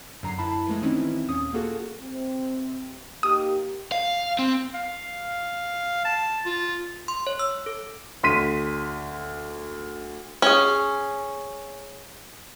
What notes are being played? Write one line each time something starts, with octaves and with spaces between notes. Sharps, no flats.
F#2 A#2 D3 F#3 A#5 C7
F#2 E4 A5 B5
E3 F3 G#3 A3
D#3 E3 C4 C#4 D#4 E4
D#2 A#2 C#4 D#6
A#3 F4 F#4 G#4 A4
C3 C4
A#3 D#4 G4 D#6
F5
C4
F5
A5
F4
C6
C#5
E6
A4
D2 C6 B6 D#7
C#4 G#4